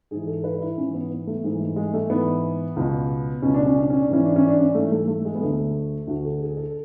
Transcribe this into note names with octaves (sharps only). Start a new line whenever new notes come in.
G#2 E3 G#4
A4
B4
E4
G#2 E3 C#4
B3
B3
A3
G#2 E3 G#3
A3
G#3
A3
G#2 E3 B3
C#2 B2
C#2 B2 C#4
D4
C#4
D4
C#4
D4
G#2 E3 C#4
D4
C#4
D4
C#4
G#2 E3 A3
A3
A3
G#3
B3
D2 D3 A3
D2 D3 F#4
A4
G#4
A4